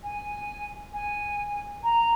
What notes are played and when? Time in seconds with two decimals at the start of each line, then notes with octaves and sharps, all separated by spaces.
0.03 G#5
0.93 G#5
1.83 A#5